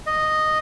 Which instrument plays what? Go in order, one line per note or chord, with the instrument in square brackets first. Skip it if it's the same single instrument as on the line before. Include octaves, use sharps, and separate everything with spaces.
[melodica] D#5